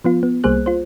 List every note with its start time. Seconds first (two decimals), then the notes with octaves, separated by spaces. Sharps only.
0.04 F3 B3 F4
0.23 B3
0.44 C2 G3 A#3 G#4 C5 F#6
0.66 F4 C5